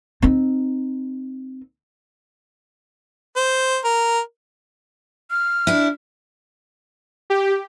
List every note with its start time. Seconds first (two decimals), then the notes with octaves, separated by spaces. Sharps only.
0.22 C4 D#4
3.36 C5
3.85 A#4
5.31 F6
5.67 D4 E4
7.30 G4